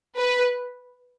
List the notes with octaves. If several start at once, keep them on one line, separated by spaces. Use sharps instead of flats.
B4